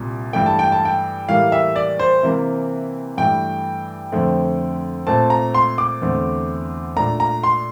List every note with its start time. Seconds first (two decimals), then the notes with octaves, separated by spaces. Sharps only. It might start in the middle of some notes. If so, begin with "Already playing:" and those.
Already playing: C2 A#2 G3
0.33 G2 E3 A3 G5
0.46 A5
0.59 G5
0.72 A5
0.85 G5
1.29 A2 E3 G3 A#3 F5
1.52 E5
1.76 D5
1.99 C5
2.23 C3 E3 A#3
3.18 G2 E3 A3 G5
4.12 F2 D3 A3 C4
5.07 A#2 A3 C4 A5
5.30 A#5
5.55 C6
5.78 D6
6.02 E2 D3 A3 C4
6.97 A#2 A3 D4 A#5
7.20 A#5
7.43 C6